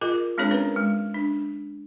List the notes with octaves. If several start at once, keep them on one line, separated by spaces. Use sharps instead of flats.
F4 G#4 A#4 D#5 D6
G#3 C4 D4 G#4 C#5
C#4 A#4 B4
G#3
D4